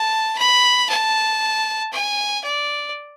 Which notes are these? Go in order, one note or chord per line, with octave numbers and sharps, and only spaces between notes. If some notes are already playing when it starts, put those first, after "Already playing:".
Already playing: A5
B5
A5
G#5
D5